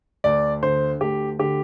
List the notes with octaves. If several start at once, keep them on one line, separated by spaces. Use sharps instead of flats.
D2 D5
D3 C5
D2 G4
D3 G4